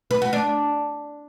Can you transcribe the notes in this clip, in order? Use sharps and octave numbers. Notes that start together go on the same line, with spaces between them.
B4
F#4
D4